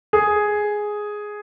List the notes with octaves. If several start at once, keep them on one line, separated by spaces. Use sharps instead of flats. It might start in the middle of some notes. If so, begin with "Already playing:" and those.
G#4